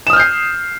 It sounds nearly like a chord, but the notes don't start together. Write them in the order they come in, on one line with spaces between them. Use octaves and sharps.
E7 D#6 F6 G6 C7